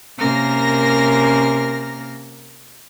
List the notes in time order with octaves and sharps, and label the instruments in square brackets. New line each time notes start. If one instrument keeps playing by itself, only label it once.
[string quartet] C3 A#3 C#4 A#4 F6 A#6